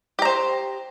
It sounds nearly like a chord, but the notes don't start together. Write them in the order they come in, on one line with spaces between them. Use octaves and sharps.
G4 A#5 C5